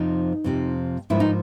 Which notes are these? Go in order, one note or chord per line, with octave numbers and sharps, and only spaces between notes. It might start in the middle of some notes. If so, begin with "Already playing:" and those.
Already playing: F2 C3 F3 D#4
F2 C3 F3
G#2 F3 A#3 D4 E4
D#4